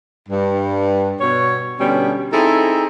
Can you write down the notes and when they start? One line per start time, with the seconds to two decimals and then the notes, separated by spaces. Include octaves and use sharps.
0.29 G2
1.19 B2 C#5
1.79 B2 D3 G3 C#4
2.32 C4 D#4 E4 G#4 A4